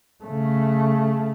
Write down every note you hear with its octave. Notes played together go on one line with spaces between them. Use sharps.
C#3 A3